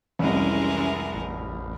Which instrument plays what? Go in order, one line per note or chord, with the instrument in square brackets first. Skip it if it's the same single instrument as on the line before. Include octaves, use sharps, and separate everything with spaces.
[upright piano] F1 C2 [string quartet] E3 G#3 A#4 [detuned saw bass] C#4
[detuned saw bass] A1